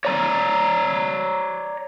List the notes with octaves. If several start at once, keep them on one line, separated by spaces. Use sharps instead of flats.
C#5 D5 A#5